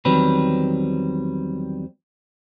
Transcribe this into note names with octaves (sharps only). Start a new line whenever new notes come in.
E2 D#3 F#3 G3 C4 B4